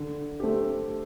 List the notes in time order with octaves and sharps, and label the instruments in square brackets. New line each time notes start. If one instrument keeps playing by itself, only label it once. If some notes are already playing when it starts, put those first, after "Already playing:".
Already playing: [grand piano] D3
A3 C4 G4